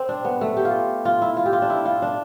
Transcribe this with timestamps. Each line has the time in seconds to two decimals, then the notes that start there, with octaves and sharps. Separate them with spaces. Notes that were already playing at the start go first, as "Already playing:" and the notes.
Already playing: C4
0.09 D4
0.25 B3
0.41 A3
0.57 G4
0.65 F4
1.05 F4
1.22 E4
1.37 F4
1.46 G4
1.53 F4
1.62 D4
1.70 E4
1.85 F4
2.02 D4